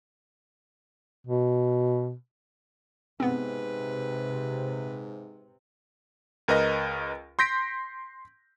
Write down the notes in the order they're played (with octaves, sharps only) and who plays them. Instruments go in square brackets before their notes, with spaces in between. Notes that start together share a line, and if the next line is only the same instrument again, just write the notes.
[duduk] B2
[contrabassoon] G#2 [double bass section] C3 [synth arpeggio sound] B3 C4 [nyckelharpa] B4
[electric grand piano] C#2 A#4 B4 D#5 A#6
C6 G6 A#6 B6 D7